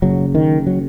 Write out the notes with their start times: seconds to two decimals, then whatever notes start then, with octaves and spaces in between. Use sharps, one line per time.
0.02 F#1 F#2 C#3 F#3
0.35 D#3
0.67 F#3